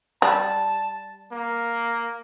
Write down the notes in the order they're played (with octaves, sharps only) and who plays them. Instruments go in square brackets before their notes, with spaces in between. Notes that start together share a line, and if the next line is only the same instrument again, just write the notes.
[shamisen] G3 [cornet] A5
[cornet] A#3